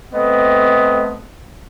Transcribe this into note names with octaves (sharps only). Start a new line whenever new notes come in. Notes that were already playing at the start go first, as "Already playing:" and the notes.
A3 B3 C4 D#5